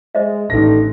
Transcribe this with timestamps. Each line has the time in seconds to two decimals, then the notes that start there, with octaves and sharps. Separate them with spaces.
0.15 G#3 C5 D#5 E5
0.50 A1 D#3 D4 A4 A#6